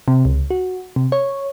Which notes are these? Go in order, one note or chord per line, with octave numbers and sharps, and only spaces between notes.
C3
C#2
F#4
C3
C#5